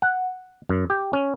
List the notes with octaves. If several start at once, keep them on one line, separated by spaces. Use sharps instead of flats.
F#5
F#2
G4
C#4